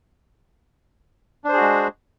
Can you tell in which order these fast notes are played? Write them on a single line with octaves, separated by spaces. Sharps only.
D4 C5 G#4 F#4 G#3